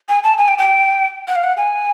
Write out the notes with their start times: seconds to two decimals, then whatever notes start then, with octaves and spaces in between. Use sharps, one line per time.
0.09 G#5
0.24 A5
0.38 G#5
0.48 G5
0.58 G5
1.28 F#5
1.35 F5
1.44 F#5
1.57 G#5